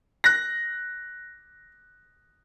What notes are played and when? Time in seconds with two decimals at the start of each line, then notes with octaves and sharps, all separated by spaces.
0.24 F#6 A#6